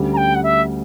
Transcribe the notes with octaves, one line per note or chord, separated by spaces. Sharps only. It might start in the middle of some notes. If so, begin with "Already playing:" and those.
Already playing: D2 D3 G3 C#4
A#5
G5
F#5
E5